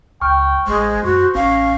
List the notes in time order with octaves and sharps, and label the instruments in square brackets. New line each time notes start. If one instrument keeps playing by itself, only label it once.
[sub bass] C#2 [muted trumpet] G5 [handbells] C#6 F6
[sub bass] A1 [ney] G#3 [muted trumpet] C5
[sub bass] F#2 [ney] F#4 [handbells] C#6
[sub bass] A1 [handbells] C#4 [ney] F5 [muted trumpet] C#6